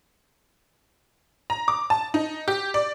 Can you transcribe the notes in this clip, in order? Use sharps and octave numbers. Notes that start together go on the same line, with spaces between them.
A#5
D6
A5
D#4
G4
D5